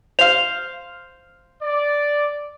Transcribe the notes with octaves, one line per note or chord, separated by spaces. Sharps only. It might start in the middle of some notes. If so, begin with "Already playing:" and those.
C5 F5 F7
D5